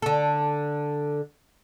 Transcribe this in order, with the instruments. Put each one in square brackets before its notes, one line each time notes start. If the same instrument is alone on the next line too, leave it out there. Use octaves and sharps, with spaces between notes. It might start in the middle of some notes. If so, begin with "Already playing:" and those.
[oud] D3 A4